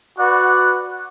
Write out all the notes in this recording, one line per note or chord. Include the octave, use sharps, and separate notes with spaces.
F#4 B4 D5 F#5